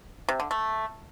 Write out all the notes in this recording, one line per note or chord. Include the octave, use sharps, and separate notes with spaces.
C3
D3
A3